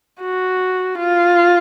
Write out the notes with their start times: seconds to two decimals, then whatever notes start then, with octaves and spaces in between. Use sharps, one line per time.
0.21 F#4
0.99 F4